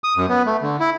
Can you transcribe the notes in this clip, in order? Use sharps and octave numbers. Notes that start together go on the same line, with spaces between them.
D#6
F#2
B3
A3
D3
E4